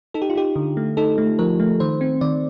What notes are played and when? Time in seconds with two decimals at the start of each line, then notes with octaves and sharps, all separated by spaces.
0.14 D#4 A4
0.22 G4
0.30 F4
0.35 D#4 G4
0.56 D3
0.77 A3
0.97 D#4 A4
1.18 A3
1.39 F3 A#4
1.60 A3
1.80 D#3 C5
2.01 C4
2.21 D#3 D5